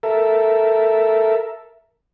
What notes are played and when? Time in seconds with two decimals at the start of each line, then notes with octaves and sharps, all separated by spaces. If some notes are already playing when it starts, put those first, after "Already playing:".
0.03 A4 A#4 E5